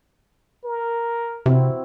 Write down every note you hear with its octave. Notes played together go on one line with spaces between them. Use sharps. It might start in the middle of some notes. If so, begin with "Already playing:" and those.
A#4
C3 C4 E4 F#4